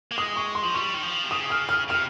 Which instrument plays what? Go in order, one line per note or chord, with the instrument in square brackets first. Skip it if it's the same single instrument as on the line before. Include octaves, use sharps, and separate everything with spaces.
[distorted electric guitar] A#3
[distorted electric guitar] G#3 [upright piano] D#6
[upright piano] C#6
C6
[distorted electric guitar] F3
[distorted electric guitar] G3 [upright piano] C#6
[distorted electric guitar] D#3
F3
C3
[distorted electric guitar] C#3 [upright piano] D#6
[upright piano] F6
F6
[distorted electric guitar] C3 [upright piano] F6